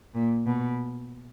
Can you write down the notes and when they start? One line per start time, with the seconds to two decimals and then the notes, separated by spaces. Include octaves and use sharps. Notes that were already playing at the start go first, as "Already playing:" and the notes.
0.15 A#2
0.46 B2